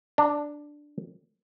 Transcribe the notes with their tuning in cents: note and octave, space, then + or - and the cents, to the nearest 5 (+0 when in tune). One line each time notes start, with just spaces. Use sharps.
D4 +0 A#5 -45